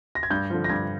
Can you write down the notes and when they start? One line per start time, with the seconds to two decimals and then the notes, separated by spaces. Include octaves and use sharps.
0.15 A#6
0.23 G#6
0.30 G2 G6
0.50 D3 F3
0.64 A#6
0.69 G2 G#6